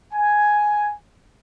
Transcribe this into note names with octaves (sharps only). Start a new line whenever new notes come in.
G#5